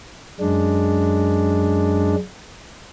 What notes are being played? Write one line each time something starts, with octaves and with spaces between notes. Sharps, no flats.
F#2 G#3 D4